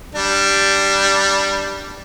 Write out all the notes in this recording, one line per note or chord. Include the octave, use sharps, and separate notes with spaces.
G3 D4